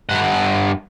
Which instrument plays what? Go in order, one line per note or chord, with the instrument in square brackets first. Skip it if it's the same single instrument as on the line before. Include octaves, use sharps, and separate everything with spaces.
[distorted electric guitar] G2 F#5